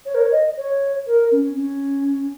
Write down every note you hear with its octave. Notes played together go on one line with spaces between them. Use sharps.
C#5
A#4
C#5
D#5
C#5
A#4
C#4
C#4